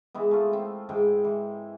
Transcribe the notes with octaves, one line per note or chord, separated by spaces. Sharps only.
E3 G#3 B3
A3 F4
C4
G#2 E3 F4 G5
E3